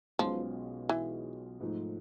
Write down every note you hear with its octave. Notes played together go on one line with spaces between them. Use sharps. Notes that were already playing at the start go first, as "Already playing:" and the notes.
B1 B2 F3 G#3 C#4 F4
E3
G#2 F3 A3